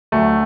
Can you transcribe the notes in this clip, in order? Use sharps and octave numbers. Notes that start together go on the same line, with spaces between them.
D2 D3 F#3 A3